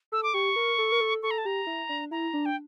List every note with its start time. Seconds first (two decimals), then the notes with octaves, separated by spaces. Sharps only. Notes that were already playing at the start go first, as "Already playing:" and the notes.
0.12 A4 E6
0.23 D6
0.34 G4 C#6
0.56 A#4
0.78 A4
0.92 A#4
1.01 A4
1.23 A4 C#6
1.31 A#5
1.38 A5
1.45 G4 A#5
1.67 E4
1.89 D4
2.11 E4 A#5
2.34 D4
2.46 G5